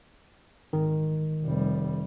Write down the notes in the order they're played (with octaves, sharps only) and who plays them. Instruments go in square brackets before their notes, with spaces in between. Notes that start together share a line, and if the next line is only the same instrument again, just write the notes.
[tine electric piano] G#1 D#3
[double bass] F1 G3